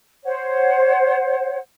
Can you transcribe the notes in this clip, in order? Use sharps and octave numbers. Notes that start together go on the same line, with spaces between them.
C5 C#5 F#5